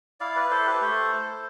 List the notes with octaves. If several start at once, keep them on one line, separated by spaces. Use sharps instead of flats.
E4 D5 F5
B4 D5
E4 A4 C5
G4 B4
A3 A4 C5
E4